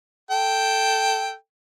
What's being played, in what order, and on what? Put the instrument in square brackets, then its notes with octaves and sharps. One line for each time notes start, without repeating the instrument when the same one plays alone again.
[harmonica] A4 G5